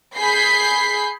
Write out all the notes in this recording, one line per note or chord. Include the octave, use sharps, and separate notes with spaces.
G#4 B5 G6 B6 C7